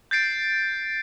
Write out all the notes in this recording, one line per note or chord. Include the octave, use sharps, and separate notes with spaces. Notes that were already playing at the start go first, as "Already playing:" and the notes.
G6 A6 C7 D7